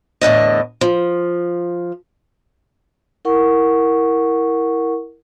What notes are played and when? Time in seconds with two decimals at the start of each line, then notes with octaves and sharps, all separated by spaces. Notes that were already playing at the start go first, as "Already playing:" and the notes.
0.21 E2 A2 D3 D#5
0.81 F3
3.25 E4 A#4 F#5 C#6